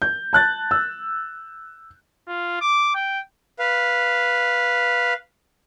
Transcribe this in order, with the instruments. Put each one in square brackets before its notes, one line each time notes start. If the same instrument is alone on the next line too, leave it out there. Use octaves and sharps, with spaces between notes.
[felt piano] G6
A5 F#6 A6
E6
[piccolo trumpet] F4
D6
G5
[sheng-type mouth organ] B4 F5